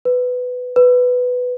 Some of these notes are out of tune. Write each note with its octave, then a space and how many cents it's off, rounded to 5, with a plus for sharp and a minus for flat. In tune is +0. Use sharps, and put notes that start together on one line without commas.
B4 +15
B4 +10